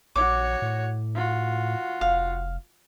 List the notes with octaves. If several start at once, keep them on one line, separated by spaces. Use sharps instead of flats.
A#1 F#4 C#5 D6
A2
F4 F#4
F1 F5